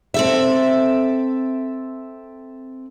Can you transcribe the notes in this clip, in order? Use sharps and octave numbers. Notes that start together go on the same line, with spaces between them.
C4 A4 E5